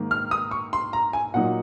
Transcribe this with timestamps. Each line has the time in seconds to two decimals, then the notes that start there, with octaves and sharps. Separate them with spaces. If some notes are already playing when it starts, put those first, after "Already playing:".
Already playing: G#2 D#3 A#3
0.11 F6
0.31 D#6
0.51 C#6
0.73 C6
0.93 A#5
1.13 G#5
1.34 A#2 F#3 A#3 D#4 F#5